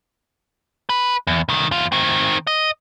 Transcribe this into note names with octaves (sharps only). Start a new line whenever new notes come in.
B4
E2
C2 D#3
E2 F4
D#3 C4
D#5